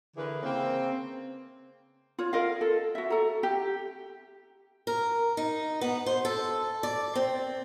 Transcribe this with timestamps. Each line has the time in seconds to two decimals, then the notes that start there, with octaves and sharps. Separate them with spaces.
0.16 D3 E3 G#4 A#4 B4
0.42 C#3 A#3 C4
2.18 F4 C#5
2.33 F4 A#4 D#5 F5
2.61 A4
2.95 F#4 E5
3.10 A4 A#5
3.43 G4
4.87 A#4
5.37 D#4
5.81 B3
6.06 C5
6.25 A4
6.83 D5
7.15 C4